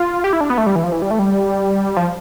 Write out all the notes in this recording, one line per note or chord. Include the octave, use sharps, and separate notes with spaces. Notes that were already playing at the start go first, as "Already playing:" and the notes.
Already playing: F4
G4
E4
D4
B3
A3
G3
E3
F3
E3
G3
A3
G3
F3